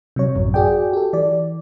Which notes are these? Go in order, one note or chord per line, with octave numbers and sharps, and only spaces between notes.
C3 F#3 C#5
A1 F#2
F#4 G#4 D5 G5
G4 A4
E3 D5